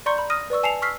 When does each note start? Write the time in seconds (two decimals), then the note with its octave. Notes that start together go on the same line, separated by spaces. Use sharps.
0.06 D5 A#5 C6 C#6 G6 C#7
0.18 B5
0.30 D#6 F6 A#6 D#7
0.50 B4 D5 C#6 E6
0.63 G#5 A5 C7 C#7 F7
0.82 C#6 E6 F6 B6 C7